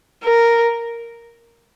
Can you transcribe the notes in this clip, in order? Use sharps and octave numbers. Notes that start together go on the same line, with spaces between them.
A#4